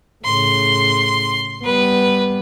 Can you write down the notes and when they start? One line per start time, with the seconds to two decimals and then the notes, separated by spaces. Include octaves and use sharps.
0.24 A2 C#3 C6
1.64 G3 B3 B4